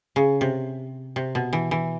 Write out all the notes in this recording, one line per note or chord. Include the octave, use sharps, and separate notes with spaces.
C#3
C3
C3
B2
E3
E3